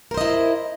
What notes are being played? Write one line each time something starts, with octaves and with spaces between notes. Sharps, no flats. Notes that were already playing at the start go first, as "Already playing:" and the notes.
E4 A#4 C5 D#5